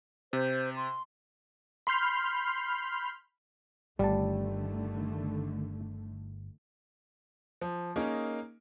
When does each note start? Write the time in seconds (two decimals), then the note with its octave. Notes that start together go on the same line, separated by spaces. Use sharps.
0.33 C3 C5
0.76 C6
1.87 B5 C6 F6 G6 C7
3.99 G1 D3 D#3 G3 A3 A5
7.61 F3
7.96 A#3 C#4 D#4 G#4 A#4